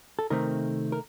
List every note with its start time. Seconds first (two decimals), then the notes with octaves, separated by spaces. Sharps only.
0.19 A4
0.30 C3 D#3 A3 C4 A#4
0.92 A#4